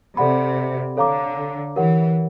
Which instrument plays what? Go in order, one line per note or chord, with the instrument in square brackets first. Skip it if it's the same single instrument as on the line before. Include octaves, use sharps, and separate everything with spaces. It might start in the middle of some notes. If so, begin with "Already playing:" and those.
[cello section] C3 [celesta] A4 D5 F#5 B5
[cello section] D3 [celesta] A4 C#5 F5 A#5 D6
[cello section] E3 [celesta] G4 A#4 C#5 F#5